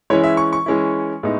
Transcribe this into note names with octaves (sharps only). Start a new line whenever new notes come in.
E3 G#3 C#4 E4 C#5
E5
C#6
C#6
E3 G#3 C#4 E4
A2 G#3 B3 D#4